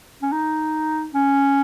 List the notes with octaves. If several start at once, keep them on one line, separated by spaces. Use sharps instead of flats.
C#4
D#4
C#4